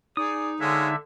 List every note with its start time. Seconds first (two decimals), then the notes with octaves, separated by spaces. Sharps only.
0.17 D#4 G#4 D5 D#6
0.60 D3 G#3 C#5 E5 F5